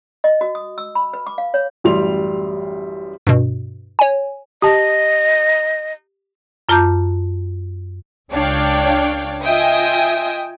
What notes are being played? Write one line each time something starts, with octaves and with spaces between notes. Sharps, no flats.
D#5
F#4
D#6
E6
B5
B4
D6
F5
C#5
A1 F#2 G3 C6 F7
G2 B2
C#5 G#5
G4 D#5 A5
F#2 F4 A5 A#5 D6 G6
C#2 D4 C#5 D5 F5 G5
F4 D#5 E5 G5 G#5 D#6